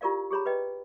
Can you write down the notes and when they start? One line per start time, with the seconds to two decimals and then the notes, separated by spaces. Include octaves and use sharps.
0.01 E4 F4 G4 A#4 D5 F5
0.31 G4 G#4 C#5 A#5 B5
0.46 B4 D5 D#5 G5